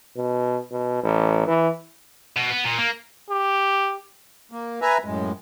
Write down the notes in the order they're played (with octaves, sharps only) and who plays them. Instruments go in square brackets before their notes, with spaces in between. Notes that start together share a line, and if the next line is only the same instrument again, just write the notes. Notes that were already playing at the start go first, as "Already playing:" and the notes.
[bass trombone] B2
B2
A1
E3
[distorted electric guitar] B2
B3
A#2
A#3
[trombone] G4
[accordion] A#3
B4 E5 G#5 A#5
F#2 A2 G#3